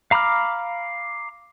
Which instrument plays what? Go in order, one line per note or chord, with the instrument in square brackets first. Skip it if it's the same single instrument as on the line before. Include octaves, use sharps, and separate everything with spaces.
[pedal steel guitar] F5 A#5 B5 D6 F6